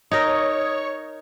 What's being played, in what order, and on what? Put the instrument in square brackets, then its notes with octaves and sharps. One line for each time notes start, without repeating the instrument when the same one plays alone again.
[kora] D#4 A#4 [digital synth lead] C#5 [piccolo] D#6